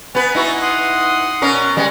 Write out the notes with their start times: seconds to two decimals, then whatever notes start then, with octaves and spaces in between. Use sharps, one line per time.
0.15 B3 B4 G#5
0.35 D#4 E4 F#4
0.62 F#5 C6 D#6
1.42 B2 C#4 A#4
1.77 G3 G#3 B3